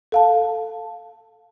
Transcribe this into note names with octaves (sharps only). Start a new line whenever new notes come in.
A4 F5 A5